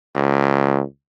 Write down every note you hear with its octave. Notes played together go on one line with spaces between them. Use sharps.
C#2